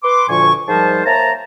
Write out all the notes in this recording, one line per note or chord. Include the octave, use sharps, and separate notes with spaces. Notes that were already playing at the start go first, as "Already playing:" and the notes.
B4 C6 D6
D2 A#2 D3 F3 G#5 C#6
G#2 F3 G3 A#4 C5 A5
A#3 C5 C#5 E5 A5 A#5